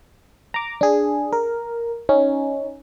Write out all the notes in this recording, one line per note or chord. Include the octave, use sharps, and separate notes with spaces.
A#5 D6
D4 G#4
A#4
C#4 D#4